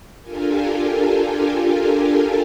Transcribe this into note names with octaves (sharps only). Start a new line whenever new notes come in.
D4 F4 G4 A4 A#4 G#5